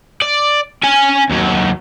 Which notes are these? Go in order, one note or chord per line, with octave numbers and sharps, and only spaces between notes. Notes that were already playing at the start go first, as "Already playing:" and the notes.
D5
C#4 G#5
D#2 F#3